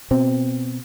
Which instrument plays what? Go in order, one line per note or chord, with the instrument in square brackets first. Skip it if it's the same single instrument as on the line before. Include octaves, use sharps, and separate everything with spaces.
[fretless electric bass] B2 C4